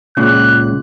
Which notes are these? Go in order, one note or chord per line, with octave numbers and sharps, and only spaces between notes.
C#2 A#2 C#3 F#6